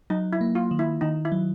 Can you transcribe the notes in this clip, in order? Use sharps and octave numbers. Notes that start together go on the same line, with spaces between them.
F#3 D#4
E4
A#3
F4
D#3
E4
D#3 D#4
E4
F#3